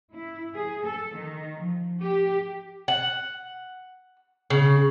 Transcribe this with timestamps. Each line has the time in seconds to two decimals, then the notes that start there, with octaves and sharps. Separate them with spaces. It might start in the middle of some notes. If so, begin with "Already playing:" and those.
0.14 E4
0.55 G#4
0.85 A4
1.15 D#3
1.60 F3
2.01 G4
2.88 F#5
4.50 C#3